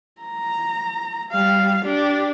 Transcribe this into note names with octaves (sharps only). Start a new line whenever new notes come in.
A#5
G3 F5
D4 G4